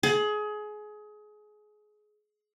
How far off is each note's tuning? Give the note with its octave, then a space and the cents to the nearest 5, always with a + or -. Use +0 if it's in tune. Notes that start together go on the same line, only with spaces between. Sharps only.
G#4 +25